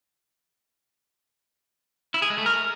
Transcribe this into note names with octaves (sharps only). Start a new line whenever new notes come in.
E4
G#4
G#3
A3
A#4